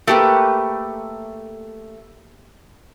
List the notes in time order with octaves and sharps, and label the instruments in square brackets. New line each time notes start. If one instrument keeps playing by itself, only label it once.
[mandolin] A3 [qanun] A#3 G4 B4